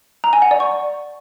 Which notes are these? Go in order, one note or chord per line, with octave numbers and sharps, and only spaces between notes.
A#5
G#5
F#5
D5
C#6